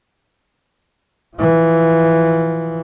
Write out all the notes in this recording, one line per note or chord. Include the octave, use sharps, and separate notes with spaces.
E3 F3